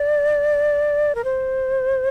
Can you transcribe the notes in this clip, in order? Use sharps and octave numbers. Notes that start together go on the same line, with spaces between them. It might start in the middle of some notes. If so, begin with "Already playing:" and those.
Already playing: D5
A#4
C5